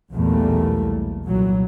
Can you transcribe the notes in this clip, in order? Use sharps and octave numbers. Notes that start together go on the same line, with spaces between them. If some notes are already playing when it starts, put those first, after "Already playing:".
B1 E2 A#2 G3 A3 A#3
C2 A#2 E3 F#3